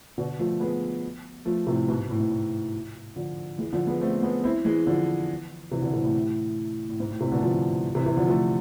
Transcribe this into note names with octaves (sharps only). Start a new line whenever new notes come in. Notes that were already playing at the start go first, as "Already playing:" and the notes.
B2 D3
F3 A3
G#3 B3
F3 A3
A2 C3
G#2 B2
A2
G#2
A2
D3 F3
E3 G#3
D3 F3
G#3 B3
A3 C4
G#3 B3
C4 E4
E3 G#3
D3 F3
C3 E3
B2 D3
A2 C3
A2
A2
G#2
A2
A2 C3
B2 D3
D3 F3
C3 E3
C3 E3
D3 F3
F3 A3